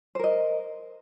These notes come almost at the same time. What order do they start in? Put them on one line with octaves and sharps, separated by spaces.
C5 A#4 D#5